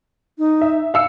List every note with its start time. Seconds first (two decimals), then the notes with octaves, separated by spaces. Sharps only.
0.38 D#4
0.61 E5
0.94 F5 E6 C#7